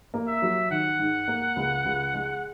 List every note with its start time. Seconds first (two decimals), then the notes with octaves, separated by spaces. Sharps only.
0.14 A#3
0.27 E5
0.42 F#3
0.70 D#3 F#5
0.99 G#2
1.28 A#3
1.56 C#2
1.85 C#2
2.14 G#3